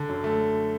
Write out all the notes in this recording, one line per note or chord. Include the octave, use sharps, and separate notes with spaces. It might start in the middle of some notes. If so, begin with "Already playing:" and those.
Already playing: D3
F#2
A3